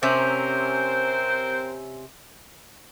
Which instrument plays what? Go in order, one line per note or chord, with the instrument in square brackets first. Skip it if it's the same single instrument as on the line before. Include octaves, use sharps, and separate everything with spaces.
[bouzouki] C3 C#4 [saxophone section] C4 A#4 C5